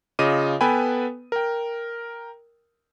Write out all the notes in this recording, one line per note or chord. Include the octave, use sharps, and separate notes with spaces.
C#3 F4 D#5 D6 D#7
B3 A4 B4 G5 G#5 B5
A#4 G5